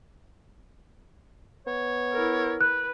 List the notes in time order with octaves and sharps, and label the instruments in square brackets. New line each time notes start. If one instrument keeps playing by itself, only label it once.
[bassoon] B3 [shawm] C#5
[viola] E4 A#4
[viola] B4 [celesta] F#6